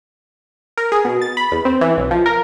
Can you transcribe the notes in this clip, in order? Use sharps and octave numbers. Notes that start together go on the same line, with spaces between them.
A#4
G#4
B2
A6
B5
E2
C4
E3
B1
F3
A#4